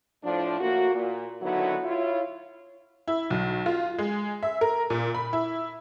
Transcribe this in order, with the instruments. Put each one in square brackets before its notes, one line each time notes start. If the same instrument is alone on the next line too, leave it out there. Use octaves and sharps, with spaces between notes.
[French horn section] A2 F3 D4
A2 A#3 F#4
A#2
D3 D#3 F#3 B3 E4 F#4
E4 F4 C#5
[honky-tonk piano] E4
B1
F4
G#3
E5
A#4
A#2
B5
E4